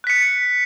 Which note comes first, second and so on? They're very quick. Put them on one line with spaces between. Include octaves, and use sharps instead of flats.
F#6 B6 C#7